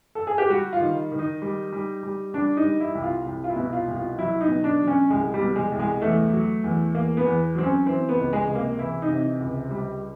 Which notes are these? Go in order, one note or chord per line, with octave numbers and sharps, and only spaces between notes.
A4
G#4
G4
G3 F#4
F4
D#3
D#3
D#4
G3
G3
G3
G3 D4
D#4
G3
E4
C2
F4
C2
F4
E4
B2
F4
C2
F4
F#3 E4
D#4
B2
D4
F#3
C#4
C2 G#3
G3
B2
G#3
C2
G#3
E2 A3
F#3
E2
E2 A#3
B3
E2
F#3 C4
C#4
E3 C4
B3
C#2
G#3
C3
A#3
E3 E4
D#4
C3
C#2
G3